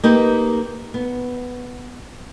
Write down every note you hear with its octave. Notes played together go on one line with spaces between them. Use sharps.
A#3 D#4 G4 B4
B3